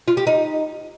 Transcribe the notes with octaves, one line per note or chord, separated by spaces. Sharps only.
F4
G4
D#4